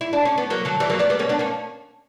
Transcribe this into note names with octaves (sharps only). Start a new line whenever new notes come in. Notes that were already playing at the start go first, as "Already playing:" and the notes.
E4
D4
C#4
B3
F#3 A#3
D3 F#3
E3 G3
F#3 A#3
B3 D4
G3 B3
A#3 C#4
B3 D4
A#3 C#4